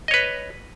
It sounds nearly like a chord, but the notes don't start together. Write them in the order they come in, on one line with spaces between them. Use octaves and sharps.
D#5 C#5 B4